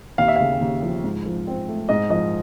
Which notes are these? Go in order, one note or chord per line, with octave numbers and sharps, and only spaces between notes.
D#2 F5
E5
C#3 F5
D#2
F3
G#2
F3
C4
A3
G#2 D#5
F3 D#5